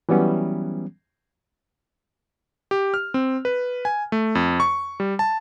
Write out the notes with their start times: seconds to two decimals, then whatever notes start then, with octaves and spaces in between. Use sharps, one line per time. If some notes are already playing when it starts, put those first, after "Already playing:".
0.09 E3 F#3 G3 B3 C#4
2.71 G4
2.94 F6
3.14 C4
3.45 B4
3.85 G#5
4.12 A3
4.35 F2
4.60 C#6
5.00 G3
5.19 A5